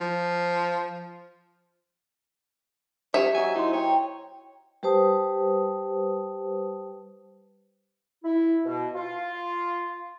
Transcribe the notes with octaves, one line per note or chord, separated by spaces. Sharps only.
F3
C#4 G4 C5 E5
F#3 D#5 G#5 E6
D#4 E4 C5 C6
C#5 G5 A#5
G3 G4 B4 C5 A5 D#6
E4
B2
F4